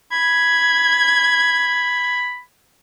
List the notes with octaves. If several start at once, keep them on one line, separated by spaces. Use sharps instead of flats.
B5 G#6